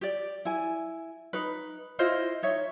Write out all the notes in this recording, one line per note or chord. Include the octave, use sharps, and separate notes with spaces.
G4 D5
E4 G#5
D#4 B4
E4 F4 C5 D#5
D#4 C#5 E5